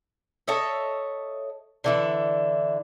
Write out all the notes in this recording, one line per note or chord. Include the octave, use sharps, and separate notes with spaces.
A4 C#5 D#5 E5
D3 E3 E4